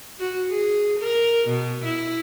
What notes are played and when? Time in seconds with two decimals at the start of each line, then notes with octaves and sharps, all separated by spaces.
0.19 F#4
0.51 G#4
0.99 A#4
1.48 B2
1.84 E4